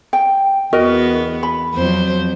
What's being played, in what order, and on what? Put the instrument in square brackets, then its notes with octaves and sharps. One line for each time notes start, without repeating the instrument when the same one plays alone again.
[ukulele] G5
[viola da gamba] E2 B3 [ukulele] F#4 A#4 D#5
[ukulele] B5
[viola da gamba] F2 F#3 C5